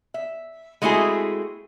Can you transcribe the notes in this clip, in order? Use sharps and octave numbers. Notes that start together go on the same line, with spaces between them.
E5
G#3 A3 C4 E4 F#4 G#4